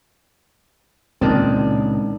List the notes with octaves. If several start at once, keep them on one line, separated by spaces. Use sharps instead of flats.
C#2 A#2 D#3 C4 D4 D5